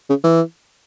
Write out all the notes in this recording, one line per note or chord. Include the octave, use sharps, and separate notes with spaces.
C#3
E3